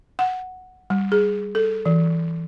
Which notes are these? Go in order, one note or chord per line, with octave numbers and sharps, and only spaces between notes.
F#5
G3
G#4
A4
E3